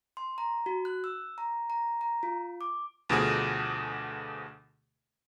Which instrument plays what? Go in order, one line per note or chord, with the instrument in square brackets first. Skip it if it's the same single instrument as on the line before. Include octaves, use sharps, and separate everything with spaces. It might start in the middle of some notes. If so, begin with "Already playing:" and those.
[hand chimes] C6
A#5
F#4
F#6
E6
A#5
A#5
A#5
F4
D6
[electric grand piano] D2 B2 F3 A3 G#4 F6